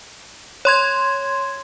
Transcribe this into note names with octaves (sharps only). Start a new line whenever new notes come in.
C#5 C6 G#6